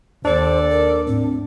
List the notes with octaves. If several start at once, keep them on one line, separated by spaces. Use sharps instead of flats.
D#2 D4 A4 C5 D5
A#4
A2 C4